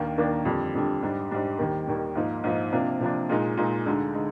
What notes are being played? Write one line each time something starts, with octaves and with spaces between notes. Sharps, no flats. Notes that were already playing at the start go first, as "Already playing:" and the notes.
Already playing: D#2 D#3 A#3 D4
D#2 D#3 A#3 D4
F2 D3 G3
F2 D3 G3
G#2 G3 D4
G#2 G3 D4
D#2 D#3 G3
D#2 D#3 G3
G#2 F3 A#3 D#4
G#2 F3 A#3 D#4
C3 F3 A#3 D4
C3 F3 A#3 D4
A#2 G#3 D#4
A#2 G#3 D#4
D2 D3 G#3 D#4
D3 G#3 D#4